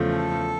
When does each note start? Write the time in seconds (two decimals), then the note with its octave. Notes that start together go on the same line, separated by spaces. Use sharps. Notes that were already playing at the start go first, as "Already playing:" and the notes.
Already playing: E2 C#3 F3 A3
0.17 A4